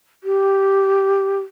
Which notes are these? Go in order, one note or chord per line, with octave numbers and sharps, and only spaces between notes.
G4